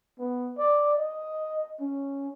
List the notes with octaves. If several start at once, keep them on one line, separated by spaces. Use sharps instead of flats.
B3
D5
D#5
C#4